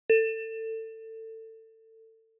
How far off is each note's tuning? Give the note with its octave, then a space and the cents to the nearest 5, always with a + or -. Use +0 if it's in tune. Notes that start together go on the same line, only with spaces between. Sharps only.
A4 +25